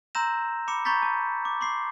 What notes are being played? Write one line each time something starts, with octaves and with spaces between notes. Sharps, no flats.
A#5 C6 E6 G6 A#6 E7
B5 D6 C#7 E7
A#5 B5 C#6 G6 A6 B6
A5
D6
C6 D6 C7